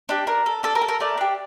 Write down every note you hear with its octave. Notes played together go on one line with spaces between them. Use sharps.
D4 G4
D4 A#4
A4
D4 A4
A#4
A4
A#4
A3 A#4 D5
D4 G4